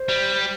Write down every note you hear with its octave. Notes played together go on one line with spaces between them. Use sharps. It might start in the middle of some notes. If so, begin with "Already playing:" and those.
Already playing: C5
G3